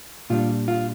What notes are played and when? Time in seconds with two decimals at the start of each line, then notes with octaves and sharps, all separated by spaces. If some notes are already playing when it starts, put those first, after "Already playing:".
0.30 A#2 G3 D4 F4
0.68 F4